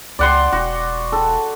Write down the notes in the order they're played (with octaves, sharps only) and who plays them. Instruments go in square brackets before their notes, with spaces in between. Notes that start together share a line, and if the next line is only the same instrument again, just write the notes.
[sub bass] C#2 [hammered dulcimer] D5 F#5 C6
[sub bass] E1 [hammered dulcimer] F#4
[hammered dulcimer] A4